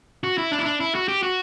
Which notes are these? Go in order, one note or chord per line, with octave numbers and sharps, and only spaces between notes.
F#4
E4
D4
E4
D4
E4
F#4
G4
F#4